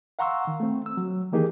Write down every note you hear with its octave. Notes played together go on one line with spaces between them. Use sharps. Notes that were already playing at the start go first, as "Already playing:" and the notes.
F5 F#5 A#5 C6 C#6 E6
D#3
A3 C4
E6
F#3
D#3 E3 A#3 D#4 G4 G#4